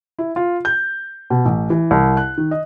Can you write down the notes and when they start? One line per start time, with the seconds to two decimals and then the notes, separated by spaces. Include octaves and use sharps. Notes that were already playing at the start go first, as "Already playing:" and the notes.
0.19 E4
0.36 F4
0.65 G6
1.30 B2
1.45 A1
1.70 E3
1.91 C2
2.17 F#6
2.38 D#3
2.51 D#5